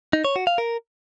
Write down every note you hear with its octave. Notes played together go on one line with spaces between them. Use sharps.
D#4
C#5
F#4
F5
A#4